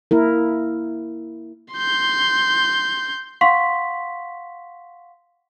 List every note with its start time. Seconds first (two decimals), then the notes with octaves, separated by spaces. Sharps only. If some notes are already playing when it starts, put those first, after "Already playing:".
0.11 A#3 E4 A#4
1.74 C6 G6
3.41 F5 F#5 C6 C#6 B6